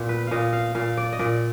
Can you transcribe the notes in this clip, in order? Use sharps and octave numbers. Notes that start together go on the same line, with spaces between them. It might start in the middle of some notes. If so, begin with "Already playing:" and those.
Already playing: A#2 B3
B4
A#2 D#5 F5
F5
A#2 F5
D5
D#5
A#2 D5